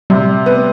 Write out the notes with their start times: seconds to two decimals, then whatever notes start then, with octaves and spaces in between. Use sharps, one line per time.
0.10 C3 G3
0.46 B3